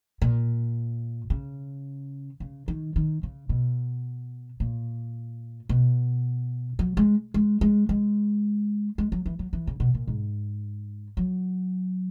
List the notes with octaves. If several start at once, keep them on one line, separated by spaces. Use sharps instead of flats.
A#2
C#3
C#3
D#3
D#3
C#3
B2
A#2
B2
F#3
G#3
G#3
G#3
G#3
G#3
F#3
E3
F#3
E3
C#3
B2
A#2
G#2
F#3